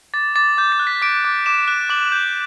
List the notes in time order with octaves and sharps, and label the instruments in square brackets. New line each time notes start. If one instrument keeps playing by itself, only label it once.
[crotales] D6 A6
D6 A6
D6 G6
A6
F#6
B6
D6 D7
D6
D6 E7
F#6
D6 F#7
G6